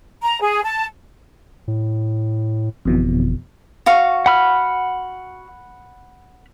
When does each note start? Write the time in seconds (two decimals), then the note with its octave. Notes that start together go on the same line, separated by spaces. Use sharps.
0.22 A#5
0.41 G#4
0.64 A5
1.68 A2
2.85 G1 F2 B2 E3
3.86 F#4 F5 C#6
4.26 F#5 B5 F6